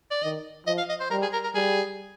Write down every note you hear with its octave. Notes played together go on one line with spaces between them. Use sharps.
D5
D#3 D#5
F3 D#5
F5
D#5
C5
G3 A#4
G#4
A#4
A#4
G3 G#4